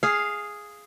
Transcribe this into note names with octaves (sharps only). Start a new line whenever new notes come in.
G#4 F5